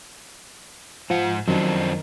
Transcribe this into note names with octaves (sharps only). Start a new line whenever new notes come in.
G#2 F3 F#5
F#2 D#3 F3 C4 D4